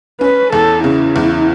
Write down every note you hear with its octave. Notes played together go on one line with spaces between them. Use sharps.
C#4 B4
E2 A4
C#3 E4
E2